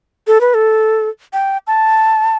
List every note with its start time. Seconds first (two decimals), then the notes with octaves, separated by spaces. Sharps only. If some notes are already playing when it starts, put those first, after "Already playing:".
0.27 A4
0.41 B4
0.54 A4
1.33 G5
1.67 A5